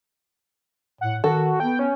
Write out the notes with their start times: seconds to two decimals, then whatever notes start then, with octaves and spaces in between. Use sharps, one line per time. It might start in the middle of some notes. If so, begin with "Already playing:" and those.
1.01 A2 F#5
1.24 D#3 F#4 A4
1.60 B3 G5
1.79 C#4